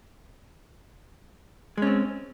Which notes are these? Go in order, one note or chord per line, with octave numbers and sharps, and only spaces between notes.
G#3 C4 C#4